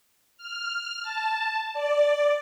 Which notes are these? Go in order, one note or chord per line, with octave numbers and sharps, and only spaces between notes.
F6
A5
D5